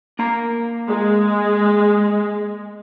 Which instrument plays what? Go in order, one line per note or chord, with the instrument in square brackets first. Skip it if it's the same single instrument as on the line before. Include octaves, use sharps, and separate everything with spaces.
[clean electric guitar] A#3 A#5
[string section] G#3